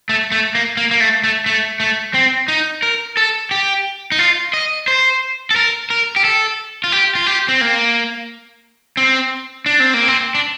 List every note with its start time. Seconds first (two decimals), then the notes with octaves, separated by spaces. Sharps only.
0.09 A3
0.32 A3
0.55 A#3
0.77 A#3
0.91 A#3
1.00 A3
1.24 A3
1.46 A3
1.80 A3
2.14 C4
2.48 D#4
2.83 A#4
3.17 A4
3.51 G4
4.12 D#4
4.19 F4
4.53 D#5
4.88 C5
5.51 A4
5.56 A#4
5.90 A#4
6.16 G4
6.25 A4
6.84 F4
6.92 G4
7.15 F4
7.26 G4
7.48 C4
7.61 A#3
8.97 C4
9.66 D4
9.80 C4
9.94 A#3
10.08 C4
10.35 D4